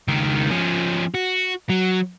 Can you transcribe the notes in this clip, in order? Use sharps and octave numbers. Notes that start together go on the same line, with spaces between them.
C#2 D#3
F3 C#4
F#4
F#3